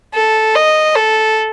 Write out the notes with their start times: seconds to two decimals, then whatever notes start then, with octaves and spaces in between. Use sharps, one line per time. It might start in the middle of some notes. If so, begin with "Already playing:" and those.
0.14 A4
0.55 D#5
0.95 A4